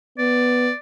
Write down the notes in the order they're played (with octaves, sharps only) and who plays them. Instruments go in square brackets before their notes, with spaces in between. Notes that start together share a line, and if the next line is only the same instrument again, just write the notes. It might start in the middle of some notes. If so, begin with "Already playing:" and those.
[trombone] B3 [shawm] D5